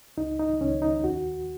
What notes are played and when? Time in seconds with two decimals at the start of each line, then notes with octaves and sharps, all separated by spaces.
0.17 C#2 D#4
0.39 D#4
0.60 C#2 C#4
0.82 D#4
1.04 D#2 F#4